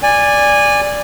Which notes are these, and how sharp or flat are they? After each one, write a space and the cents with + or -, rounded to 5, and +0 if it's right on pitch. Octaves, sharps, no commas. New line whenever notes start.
D5 +0 G#5 -15